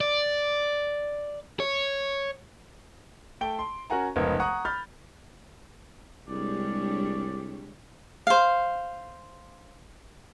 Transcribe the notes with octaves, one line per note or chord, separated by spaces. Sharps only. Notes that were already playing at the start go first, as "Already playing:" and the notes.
D5
C#5
A3 G5 A5 D7 G7
C6
C#4 F#4 A#4 F#5 G#5 A#5
F1 C#2 B3 D#4 A#4 G#6
F#5 A#5 C#6 D#6 F#6
B5 F6 G6 A6
C2 G3 G#3 D4 G4 C#5 D5
C5 F5